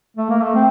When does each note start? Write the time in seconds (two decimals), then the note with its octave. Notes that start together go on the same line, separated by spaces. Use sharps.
0.17 A3
0.30 A#3
0.42 A3
0.55 C4